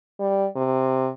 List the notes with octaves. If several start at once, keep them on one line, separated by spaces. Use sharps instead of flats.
G3
C3